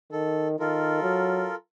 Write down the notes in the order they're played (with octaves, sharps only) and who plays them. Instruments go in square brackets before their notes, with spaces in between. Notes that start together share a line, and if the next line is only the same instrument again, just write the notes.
[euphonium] D#3 [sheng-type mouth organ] A4
[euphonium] D#3 [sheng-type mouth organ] F4 A4 A#4
[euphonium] F#3